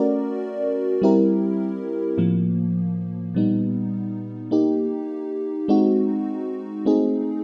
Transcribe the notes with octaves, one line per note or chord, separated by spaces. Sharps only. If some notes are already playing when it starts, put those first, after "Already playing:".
Already playing: A3 C#4 F#4 A#4 D5
G3 C4 E4 G4 A#4
A2 F3 A#3
A#2 G3 B3 D#4
A#3 D#4 G4
G#3 C4 D#4 F#4
A3 C4 D#4 G#4